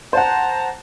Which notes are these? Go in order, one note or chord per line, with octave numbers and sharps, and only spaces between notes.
C5 F#5 A5 A#5